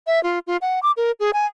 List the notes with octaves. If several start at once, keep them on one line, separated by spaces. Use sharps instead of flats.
E5
F4
F4
F#5
D6
A#4
G#4
G#5